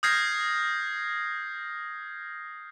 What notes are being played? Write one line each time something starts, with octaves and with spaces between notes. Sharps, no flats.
D#6 F6 G6 G#6 A#6 C7